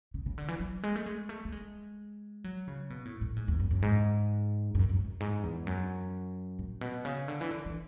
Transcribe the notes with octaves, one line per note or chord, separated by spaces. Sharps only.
C#3
C#3
D3
E3
F#3
G#3
A3
G#3
A3
A3
G#3
F#3
C#3
B2
A2
A2
G#2
E2
F#2
F#2
G#2
F#2
F#2
F#2
G#2
E2
F#2
A2
B2
C#3
D3
E3
D3
E3